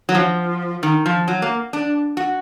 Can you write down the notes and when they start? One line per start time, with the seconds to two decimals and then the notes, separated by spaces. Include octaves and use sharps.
0.09 F#3
0.15 F3
0.83 D#3
1.06 F3
1.28 F#3
1.42 A#3
1.73 D4
2.17 F#4